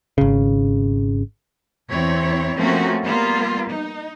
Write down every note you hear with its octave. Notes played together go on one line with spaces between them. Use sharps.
G#1 C#3
E2 C4 E4 C#5
F3 A3 A#3 C4 C#4 F#4
G3 A#3 B3 F4
D#4